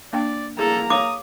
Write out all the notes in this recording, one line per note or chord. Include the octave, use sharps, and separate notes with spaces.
A#3 D4 D5 G5
A#3 E4 G#4 A4 A#5
C#5 F5 D6 D#6